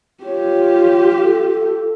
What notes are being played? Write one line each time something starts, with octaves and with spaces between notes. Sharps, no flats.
F4 G4 C#5
A4